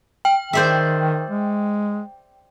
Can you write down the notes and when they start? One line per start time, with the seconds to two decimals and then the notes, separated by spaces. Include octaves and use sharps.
0.25 G5
0.53 D#3 C5 D5 E5
1.30 G#3